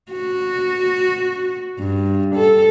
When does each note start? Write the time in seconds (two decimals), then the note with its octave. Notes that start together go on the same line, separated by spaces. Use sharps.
0.12 F#4
1.79 G2
2.35 A4